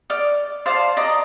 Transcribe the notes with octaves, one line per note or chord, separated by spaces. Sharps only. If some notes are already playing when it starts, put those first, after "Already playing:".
D5 F6
C5 D5 F5 A5
D5 D#5 A#5